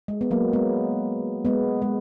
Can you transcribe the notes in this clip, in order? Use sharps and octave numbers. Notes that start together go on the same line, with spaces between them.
G#3
B3
F#3 A#3
G#3 B3
G#3 B3
G#3